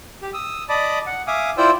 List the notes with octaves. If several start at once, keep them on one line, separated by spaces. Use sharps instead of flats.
G4
D#6 E6
D5 D#5 A5 B5 D6 D#6
F#5
E5 F5 G#5 D6 D#6
E4 F4 C5 D5 G5 E6